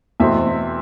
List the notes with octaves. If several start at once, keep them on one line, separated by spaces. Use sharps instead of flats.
E2 B2 A3 C4 E5